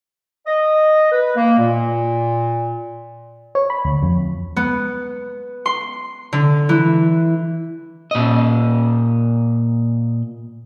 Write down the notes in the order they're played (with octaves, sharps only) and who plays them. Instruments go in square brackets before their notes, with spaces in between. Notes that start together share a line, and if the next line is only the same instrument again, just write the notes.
[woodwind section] D#5
B4
A#3
A#2
[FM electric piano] C#5
B5
D2
F2
[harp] B3
C6
D3
E3
[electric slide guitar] A#2 D#5